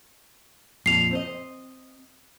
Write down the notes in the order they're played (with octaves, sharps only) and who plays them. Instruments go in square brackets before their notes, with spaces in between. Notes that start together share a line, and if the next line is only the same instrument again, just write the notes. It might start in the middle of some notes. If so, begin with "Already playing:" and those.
[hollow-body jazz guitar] F2 A#2 [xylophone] C7 F7
[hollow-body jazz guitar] C4 C5 D#5